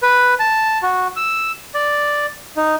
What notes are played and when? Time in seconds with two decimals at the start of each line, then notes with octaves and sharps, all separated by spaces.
0.03 B4
0.40 A5
0.83 F#4
1.16 E6
1.74 D5
2.57 D#4